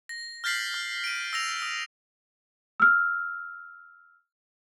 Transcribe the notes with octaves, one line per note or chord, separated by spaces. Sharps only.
A#6
F6 G6 A6 B6 C7 F#7
F6
D7 D#7
E6 A#6 F7
D#6
E6 F6